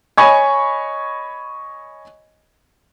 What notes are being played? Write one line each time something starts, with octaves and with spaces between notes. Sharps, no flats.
C#5 D#5 G#5 B5 C#6 G#6